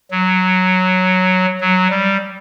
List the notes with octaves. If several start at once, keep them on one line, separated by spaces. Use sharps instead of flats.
F#3
F#3
G3